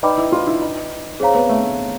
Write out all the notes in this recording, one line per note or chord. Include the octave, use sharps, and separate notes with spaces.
D#4 B4 D5 G5 B5 D6
E4
F4
E4
D#4
C4 G#4 C#5 F5 A#5
B3
A3